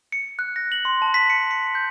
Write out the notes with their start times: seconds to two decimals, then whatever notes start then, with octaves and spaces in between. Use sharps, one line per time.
0.12 C#7
0.39 F#6
0.56 A#6
0.72 F#7
0.85 C6
1.02 A5
1.14 B6
1.30 C#7
1.51 C#7
1.75 G6